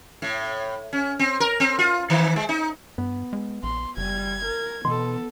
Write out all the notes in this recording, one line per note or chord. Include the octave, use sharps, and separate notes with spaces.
A2
C#4
C4
A#4
C4
F4
D#3
G#3
D#4
G2 B3
G#3
A#1 C6
F#1 G3 G#6
A#4
B2 E3 B3 A4 C6